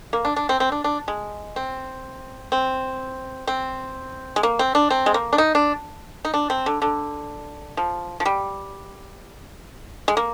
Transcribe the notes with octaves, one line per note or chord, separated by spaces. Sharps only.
A#3
D4
D4
C4
C4
D4
D4
G#3
C4
C4
C4
G#3
A#3
C4
D4
C4
G#3
A#3
D4
D#4
D4
D#4
D4
C4
D3
D3
F3
F3
G3
G#3
A#3